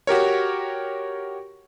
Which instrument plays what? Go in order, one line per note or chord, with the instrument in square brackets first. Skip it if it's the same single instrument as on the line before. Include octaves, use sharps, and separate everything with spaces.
[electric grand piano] F#4 G4 A#4 C#5